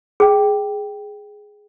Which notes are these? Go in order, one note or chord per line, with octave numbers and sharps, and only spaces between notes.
G#4 G5